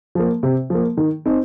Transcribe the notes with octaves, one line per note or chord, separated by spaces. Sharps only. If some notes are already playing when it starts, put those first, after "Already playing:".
F3 A#3
C3
F3 A#3
D#3
C4 D#4